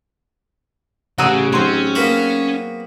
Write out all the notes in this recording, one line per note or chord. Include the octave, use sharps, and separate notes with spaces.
A1 C#3 F#4 G#4 F#5 A#5 E6
F#3 C4 C#4 D#4 C6
A#3 B3 F#4